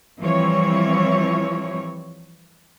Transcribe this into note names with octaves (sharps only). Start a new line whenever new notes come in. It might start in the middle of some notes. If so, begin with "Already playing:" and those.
E3 F3 G3 C4 E4 C#5